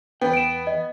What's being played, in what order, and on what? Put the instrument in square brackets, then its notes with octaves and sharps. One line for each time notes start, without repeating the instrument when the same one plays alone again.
[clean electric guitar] E2 G5 [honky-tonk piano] B3
[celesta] D7 E7
D#5